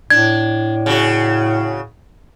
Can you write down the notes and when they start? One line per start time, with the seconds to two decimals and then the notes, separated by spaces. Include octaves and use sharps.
0.10 A2 D4 G#6
0.86 C#3 F#4